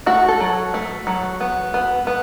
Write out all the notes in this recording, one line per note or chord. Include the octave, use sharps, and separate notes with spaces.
A3 F#4
A4
F#3
A3
F#3
B3
B3
B3